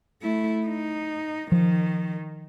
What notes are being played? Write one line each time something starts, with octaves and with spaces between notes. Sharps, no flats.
A3 E4
D#4
D#3 F3